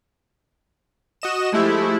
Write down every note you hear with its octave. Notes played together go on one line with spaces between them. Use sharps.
F#4 D#5 E7
F3 G#3 A3 E4 G4